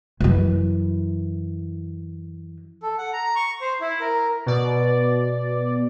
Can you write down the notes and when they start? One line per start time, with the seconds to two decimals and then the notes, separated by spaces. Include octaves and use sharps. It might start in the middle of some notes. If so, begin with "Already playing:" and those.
0.20 F#2 E3
2.82 A4
2.98 F#5
3.13 A#5
3.36 C#6
3.61 C5
3.81 E4
4.00 A#4
4.46 B2 D5